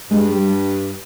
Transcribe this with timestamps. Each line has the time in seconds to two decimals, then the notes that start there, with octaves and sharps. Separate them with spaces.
0.11 G2 G#3
0.29 G#3
0.33 G3